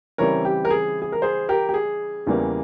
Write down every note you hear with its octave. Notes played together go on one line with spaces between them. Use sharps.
C#3 E3 G3 C4 E4 A#4 C#5
G4
A#4
G#4
G#4
A#4
G#4 C5
G4 A#4
G4
G#4
E2 C#3 E3 G3 A#3